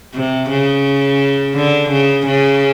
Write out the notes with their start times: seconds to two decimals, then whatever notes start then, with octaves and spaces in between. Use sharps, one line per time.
0.14 C3
0.50 C#3
1.55 D3
1.90 C#3
2.27 C#3